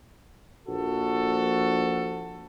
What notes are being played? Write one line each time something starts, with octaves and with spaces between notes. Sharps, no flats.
A#1 F#4 A4